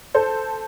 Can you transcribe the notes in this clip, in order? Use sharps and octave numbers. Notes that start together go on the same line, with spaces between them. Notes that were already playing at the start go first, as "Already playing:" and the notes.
A4 C5